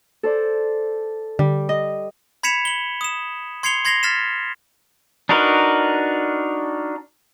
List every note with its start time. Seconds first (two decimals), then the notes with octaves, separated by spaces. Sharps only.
0.23 A4 C5 D5
1.39 D3 G3
1.69 D#5
2.43 B5 G#6 B6 C#7 E7 F7
2.65 F#7 G7
3.01 D#6 E7
3.63 C6 G#6 C7 C#7 F7 G7
3.85 C6 G#6 A#6 C7 F7 G7
4.03 F6 A6 B6 E7
5.29 D4 D#4 F#4 A#4 B4